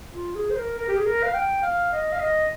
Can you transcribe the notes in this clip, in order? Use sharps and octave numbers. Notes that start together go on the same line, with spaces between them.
F4
G#4
C5
A#4
A#4
G4
G#4
A#4
F5
G5
F5
D#5
F5
D#5